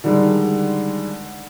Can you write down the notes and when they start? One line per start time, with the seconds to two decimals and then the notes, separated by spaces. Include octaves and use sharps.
0.04 D3 D#3 G3 G#3